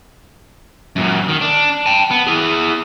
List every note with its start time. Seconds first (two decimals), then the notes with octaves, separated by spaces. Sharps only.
0.96 F#2 A#2
1.28 D#3
1.41 D4
1.86 G5 A5
2.11 B3
2.27 E4 G#4